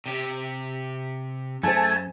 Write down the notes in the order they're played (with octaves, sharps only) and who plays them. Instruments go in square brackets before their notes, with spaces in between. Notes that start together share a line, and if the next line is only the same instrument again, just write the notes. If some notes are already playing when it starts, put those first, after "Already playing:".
[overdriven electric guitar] C3 G4
[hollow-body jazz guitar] F#2 G#4 C5 [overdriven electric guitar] A3 [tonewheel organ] G#5 A5